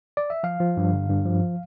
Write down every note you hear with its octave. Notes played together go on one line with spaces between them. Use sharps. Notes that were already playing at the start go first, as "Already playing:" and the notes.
D5
E5
F3 F5
F3
G2
D3
G2
F3